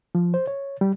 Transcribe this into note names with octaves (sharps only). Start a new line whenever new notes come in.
F3
C5
C#5
G3